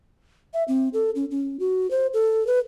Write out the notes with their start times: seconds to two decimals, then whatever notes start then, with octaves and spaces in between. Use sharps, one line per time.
0.54 E5
0.68 C4
0.93 A4
1.15 C#4
1.31 C#4
1.60 F#4
1.91 C5
2.14 A4
2.47 B4